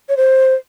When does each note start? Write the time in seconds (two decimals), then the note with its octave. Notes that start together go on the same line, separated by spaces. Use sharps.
0.09 C#5
0.17 C5